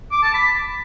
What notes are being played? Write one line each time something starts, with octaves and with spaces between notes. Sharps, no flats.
D6
A5
B5